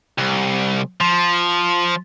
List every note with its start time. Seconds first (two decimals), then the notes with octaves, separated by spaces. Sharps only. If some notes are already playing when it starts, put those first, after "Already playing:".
0.18 C2
1.01 F3